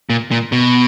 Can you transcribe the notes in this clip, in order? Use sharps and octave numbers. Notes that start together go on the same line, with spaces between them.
A#2
A#2
B2